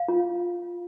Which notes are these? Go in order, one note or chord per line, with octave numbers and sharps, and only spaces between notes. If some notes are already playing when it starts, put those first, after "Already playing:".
Already playing: F5
F4